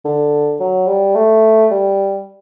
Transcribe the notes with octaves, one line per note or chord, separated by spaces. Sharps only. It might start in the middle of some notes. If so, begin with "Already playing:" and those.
D3
F#3
G3
A3
G3